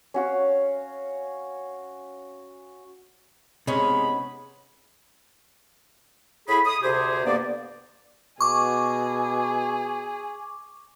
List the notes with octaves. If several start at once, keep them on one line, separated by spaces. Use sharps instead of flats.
C#4 F#4 F5
C3 G#3 B3 C#4 D#4 C#5 B5
A2 E4 G#4 B5
D#6
D2 C3 G4 G#4 C5
G2 A#3 B3 D5
B2 G#4 C#6 D6